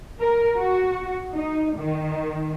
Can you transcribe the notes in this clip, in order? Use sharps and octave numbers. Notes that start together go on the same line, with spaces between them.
A#4
F#4
D#4
D#3